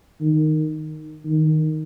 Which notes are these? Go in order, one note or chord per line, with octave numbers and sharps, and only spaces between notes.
D#3
D#3